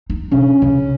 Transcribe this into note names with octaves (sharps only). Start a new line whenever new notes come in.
D#4
C3 C#4 D4
C#3 D#4